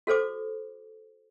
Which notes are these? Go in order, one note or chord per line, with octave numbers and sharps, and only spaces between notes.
F#4 A4 C5 D6